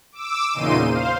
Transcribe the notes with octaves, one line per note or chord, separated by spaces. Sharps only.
D6 E6
E2 A#2 C#3 D#4 C6 D#7
C5 F5